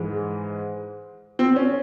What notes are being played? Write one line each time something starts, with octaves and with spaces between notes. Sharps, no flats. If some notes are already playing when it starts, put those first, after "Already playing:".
Already playing: G#2 E3 G#3
C4
C#4